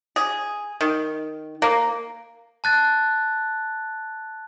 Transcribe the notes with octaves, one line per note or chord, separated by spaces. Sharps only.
G#4
D#3
A#3
A5 F#6 A6